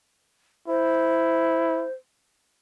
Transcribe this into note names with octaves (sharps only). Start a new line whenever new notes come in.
E4 C5